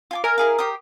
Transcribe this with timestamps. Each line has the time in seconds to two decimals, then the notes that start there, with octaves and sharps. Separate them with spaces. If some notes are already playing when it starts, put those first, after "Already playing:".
0.11 F4 G#5 D6
0.24 A#4 E5 G#5 A#5
0.38 E4 G#4 F5
0.59 G4 C5 D#6